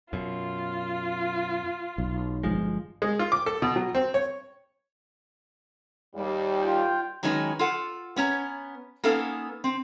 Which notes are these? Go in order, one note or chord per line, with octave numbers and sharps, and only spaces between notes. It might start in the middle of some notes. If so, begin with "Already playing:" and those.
F#2 B2 F4
B1
G1 F3 G#3
G#3
F4
D6
A4
B2
F#3
C4
C#5
D#2 G3
F4 G5
D#3 F#3 G#3 C#4 D#4 B4
F4 A4 F#5
B3 C#4 C#5 A#5
A#3 B3 C#4 D#4 A4 F5
C4